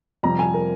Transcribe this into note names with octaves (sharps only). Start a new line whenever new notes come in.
F2 C3 G3 A#5
G#5
A#4